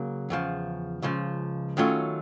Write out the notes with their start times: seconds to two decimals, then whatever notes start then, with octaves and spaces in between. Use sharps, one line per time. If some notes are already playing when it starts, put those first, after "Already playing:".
Already playing: C#3 F#3 A#3
0.30 E2 C#3 F3
1.02 C#2 C#3 F3
1.77 D#3 F#3 A3 C#4 F4